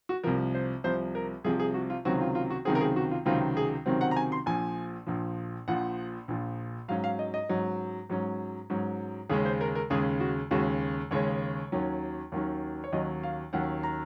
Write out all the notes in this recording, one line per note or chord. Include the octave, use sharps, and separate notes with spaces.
F#4
C2 C3 F3 A#4
C5
C2 C3 F3 C5
A#4
C2 C3 F3 G#4
G#4
F#4
F4
C#2 C3 D#3 F#3 C4 F#4
F4
F4
F#4
C#2 C3 D#3 F#3 C4 G#4
A#4
G#4
F#4
F4
C#2 C3 D#3 F#3 C4 F4
G#4
C#2 C3 D#3 F#3 C4
F#5
A#5
G#5
C6
A#1 A#2 F3 G#5
A#1 A#2 F3
A#1 A#2 F3 F#5
A#1 A#2 F3
G#2 F#3 C#4 F5
F5
D#5
D#5
G#2 F#3 C#4
G#2 F#3 C#4
G#2 F#3 C#4
D#2 C#3 G#3 C#4 G#4
C5
A#4
A#4
D#2 C#3 G#3 C#4 G#4
F#4
D#2 C#3 G#3 C#4 F#4
D#2 C#3 G#3 C#4 C#5
D#2 D#3 F#3 C#4
D#2 D#3 F#3 C#4
C#5
D#2 D#3 F#3 C#4 D#5
F5
D#2 D#3 F#3 C#4 F#5
A#5